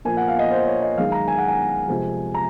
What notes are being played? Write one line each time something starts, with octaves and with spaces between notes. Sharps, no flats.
A#2 F3 A#3 G#5
F#5
F5
D#5
C5
C#5
D#5
F#2 D#3 G#3 F5
A#5
G#5
F#5
G#5
F2 C3 F3 G#3
A#5